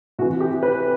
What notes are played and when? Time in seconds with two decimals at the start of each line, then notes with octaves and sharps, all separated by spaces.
0.19 C3 E3 F#4
0.41 G4
0.63 B4